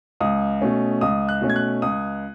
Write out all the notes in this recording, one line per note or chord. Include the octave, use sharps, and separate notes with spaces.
C#2 D#6
B2 A3 C#4
C#2 D#6
F#6
B2 A3 C#4
G#6
F#6
C#2 D#6